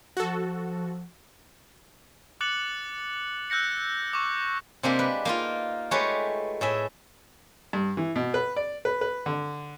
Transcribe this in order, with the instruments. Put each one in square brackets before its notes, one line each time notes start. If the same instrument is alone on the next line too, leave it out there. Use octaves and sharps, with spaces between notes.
[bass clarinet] F3 [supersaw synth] F#4 A4
[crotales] D6 F#6 A6 C#7 F#7
E6 F#6 G6 A#6 C#7
C#6 D6
[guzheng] C3 G#3 A#3 D4 G4
B4
A#3 D#4 F4
G#3 A3 G4 B4 C#5
A2 G#4 E5
[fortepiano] G2
E3
B2
B4
D5
B4
B4
D3